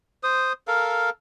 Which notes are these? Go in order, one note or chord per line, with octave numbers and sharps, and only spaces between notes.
C5 D#6
A4 A#4 F5